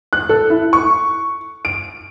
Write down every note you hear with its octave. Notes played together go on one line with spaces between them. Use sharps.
F#6
A4
E4
C#6
D7